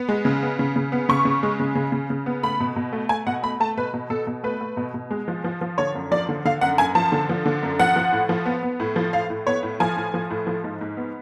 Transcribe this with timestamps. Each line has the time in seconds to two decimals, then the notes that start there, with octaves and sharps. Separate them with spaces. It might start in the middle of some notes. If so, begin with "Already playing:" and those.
Already playing: B3
0.09 G#3
0.25 C#3
0.42 B3
0.59 C#3
0.76 C#3
0.92 B3
1.09 C#3 C#6
1.25 C#3
1.43 G#3
1.60 C#3
1.75 C#3
1.92 C#3
2.10 C#3
2.26 B3
2.43 A3 B5
2.60 B2
2.76 B2
2.93 A3
3.09 A3 G#5
3.27 B2 F#5
3.43 A3 B5
3.60 A3 A5
3.77 B2 B4
3.94 B2
4.10 B2 A4
4.27 B2
4.44 A3 B4
4.61 A3
4.77 B2
4.94 B2
5.11 G#3
5.28 F3
5.44 F3
5.61 F3
5.78 D3 C#5
5.95 F#2
6.11 F3 D5
6.29 D3
6.45 D3 F5
6.61 F#2 F#5
6.78 F#2 G#5
6.95 F3 A5
7.12 D3
7.29 F3
7.46 D3
7.63 F#2
7.79 F3 F#5
7.96 F3
8.12 A2
8.29 F3
8.45 B3
8.63 B3
8.80 A2
8.96 F3
9.13 A2 F5
9.30 A2
9.47 B3 C#5
9.63 A2
9.80 F3 G#5
9.96 A2
10.14 F3
10.30 A2
10.47 F3
10.64 G#2
10.81 G#2
10.97 B3